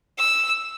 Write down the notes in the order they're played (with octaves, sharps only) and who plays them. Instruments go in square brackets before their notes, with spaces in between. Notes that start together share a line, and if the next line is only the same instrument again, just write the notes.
[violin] E6